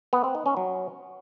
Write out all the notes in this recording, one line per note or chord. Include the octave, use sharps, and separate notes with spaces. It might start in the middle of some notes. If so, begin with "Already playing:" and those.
B3
C4
D#4
C#4
F#3